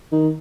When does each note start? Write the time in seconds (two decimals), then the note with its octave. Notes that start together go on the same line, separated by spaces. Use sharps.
0.12 D#3